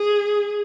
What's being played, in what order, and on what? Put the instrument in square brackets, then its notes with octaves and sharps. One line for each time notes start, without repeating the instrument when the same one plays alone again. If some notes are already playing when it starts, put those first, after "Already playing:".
Already playing: [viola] G#4